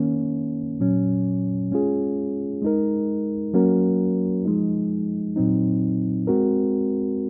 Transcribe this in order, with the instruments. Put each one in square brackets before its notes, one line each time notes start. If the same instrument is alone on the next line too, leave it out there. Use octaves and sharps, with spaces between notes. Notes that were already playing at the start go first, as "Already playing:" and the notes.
Already playing: [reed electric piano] D#3 A#3 C#4
A#2 F#3 C#4
G#3 C#4 F4 G#4
G#3 D#4 A#4
F#3 A#3 C#4 F#4 A#4
F3 G#3 D#4
A#2 F#3 C4 D#4
G#3 C4 F#4 A#4